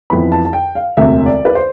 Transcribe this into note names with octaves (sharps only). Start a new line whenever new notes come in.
F2 E3 B3 B5
A5
A5
G5
F5
E1 D2 C3 E5
D5
B4
C5